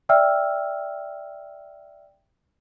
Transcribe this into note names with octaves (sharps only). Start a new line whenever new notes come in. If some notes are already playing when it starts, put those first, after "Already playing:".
D5 E5 G5 E6 F6